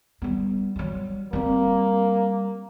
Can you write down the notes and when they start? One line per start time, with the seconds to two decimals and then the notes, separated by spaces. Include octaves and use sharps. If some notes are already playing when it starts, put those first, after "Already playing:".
0.22 G3 B3
0.76 F#3 G3
1.33 G3 A#3 C4